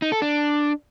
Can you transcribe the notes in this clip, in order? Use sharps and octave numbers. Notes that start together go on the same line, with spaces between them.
D#4
A4
D4